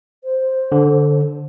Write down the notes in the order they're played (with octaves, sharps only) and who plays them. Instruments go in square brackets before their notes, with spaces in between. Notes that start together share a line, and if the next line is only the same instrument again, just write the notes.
[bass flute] C5
[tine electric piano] D3